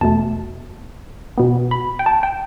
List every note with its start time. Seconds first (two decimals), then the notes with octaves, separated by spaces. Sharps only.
0.01 E2 B2 A3 A5
1.38 B2 B3
1.71 B5
1.99 G5
2.06 A5
2.23 G5